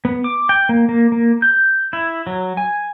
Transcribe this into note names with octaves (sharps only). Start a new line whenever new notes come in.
B3
D6
G5
A#3
A#3
A#3
G6
E4
F#3
G#5